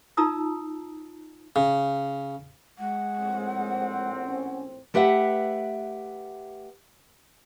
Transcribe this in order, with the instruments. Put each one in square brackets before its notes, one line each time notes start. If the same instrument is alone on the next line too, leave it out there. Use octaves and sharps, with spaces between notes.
[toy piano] D#4 F4 A5 A#5 D#6 E6
[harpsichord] C#3
[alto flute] G#3 [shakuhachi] F#5
[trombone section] A#1 A2 C4
[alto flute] C#4
[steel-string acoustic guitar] A3 G4 B4 E5 F#5